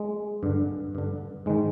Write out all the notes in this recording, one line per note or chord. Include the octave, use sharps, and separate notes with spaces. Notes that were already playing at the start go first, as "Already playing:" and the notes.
Already playing: G#3
G2 D3
G2 D3
G#2 D#3 G#3